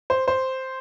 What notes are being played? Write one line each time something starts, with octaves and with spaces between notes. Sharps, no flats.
C5
C5